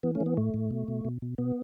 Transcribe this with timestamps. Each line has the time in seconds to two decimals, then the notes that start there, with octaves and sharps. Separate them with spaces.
0.03 E3 B3
0.15 A3 C#4
0.20 E3
0.26 B3
0.37 A2 A3
0.54 A2
0.71 B2
0.88 B2
1.05 B2
1.22 B2
1.38 B2 B3